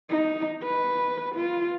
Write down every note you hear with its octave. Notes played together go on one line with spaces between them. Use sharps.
D#4
B4
F4